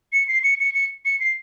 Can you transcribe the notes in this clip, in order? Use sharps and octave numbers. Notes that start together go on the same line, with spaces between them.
C#7
C7
C#7
C#7
C#7
C#7
C7